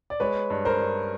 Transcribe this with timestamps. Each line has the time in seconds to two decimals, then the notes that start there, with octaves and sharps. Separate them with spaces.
0.10 D5
0.20 G#3 B4 C#5
0.50 G2
0.65 A#4 C5
0.80 G2